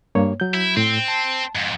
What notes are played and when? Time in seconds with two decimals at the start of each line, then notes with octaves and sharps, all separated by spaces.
0.15 G2 A#3 C#5
0.40 F#3 G6
0.54 E4
0.77 A2 C4
1.08 A5
1.55 F2 G#2